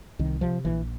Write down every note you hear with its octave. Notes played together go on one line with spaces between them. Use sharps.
C2 D#3
C3 F3
A#1 E3